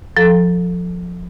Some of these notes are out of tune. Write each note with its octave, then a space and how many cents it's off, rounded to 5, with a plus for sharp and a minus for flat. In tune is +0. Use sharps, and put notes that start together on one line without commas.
F3 +20 A4 +0 A#5 +0